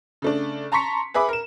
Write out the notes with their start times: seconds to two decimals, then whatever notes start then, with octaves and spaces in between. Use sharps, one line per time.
0.22 C#3 A3 D4
0.72 A5 A#5 C6 C#6 B6 C#7
1.14 G#4 B4 E5 B5 D6
1.29 A#4 E7